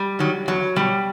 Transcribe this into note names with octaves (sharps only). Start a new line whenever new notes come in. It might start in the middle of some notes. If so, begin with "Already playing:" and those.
Already playing: G3
D#3 F#3
E2 F#3
B2 F#3 G3